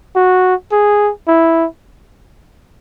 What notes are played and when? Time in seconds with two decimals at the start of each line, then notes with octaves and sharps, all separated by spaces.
0.16 F#4
0.72 G#4
1.27 E4